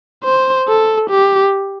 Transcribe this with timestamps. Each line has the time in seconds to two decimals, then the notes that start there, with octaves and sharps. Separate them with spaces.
0.24 C5
0.68 A4
1.10 G4